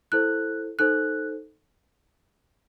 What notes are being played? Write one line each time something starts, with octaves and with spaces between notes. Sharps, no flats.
E4 A4 C5 F#6
D#4 A4 C5 F#6